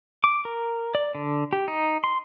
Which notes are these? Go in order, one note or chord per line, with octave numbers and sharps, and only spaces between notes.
D6
A#4
D5
D3
G4
D#4
C6